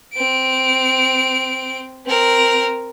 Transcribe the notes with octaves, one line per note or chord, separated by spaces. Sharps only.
C4 D7
C4 A#4